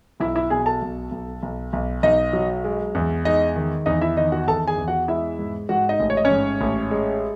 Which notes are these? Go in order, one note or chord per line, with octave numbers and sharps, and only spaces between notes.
B1 E4 E5
E4 E5
B2 G#4 G#5
A4 A5
B1
B1
B1
B1
B1 D#4 D#5
F#3
G#3
E2
G#3 D#4 D#5
D#3
E2 D#4 D#5
E4 E5
D#3 D#4 D#5
F#4 F#5
E2 A4 A5
G#4 G#5
E2
F#4 F#5
G#3 E4 E5
G#2
G#2 F#4 F#5
D#4 D#5
A1
C#5
D#5
C#4 C#5
G#2
A1
G#3